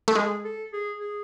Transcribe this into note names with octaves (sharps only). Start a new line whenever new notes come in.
A3
G#3 G#4
A4
G#4
G#4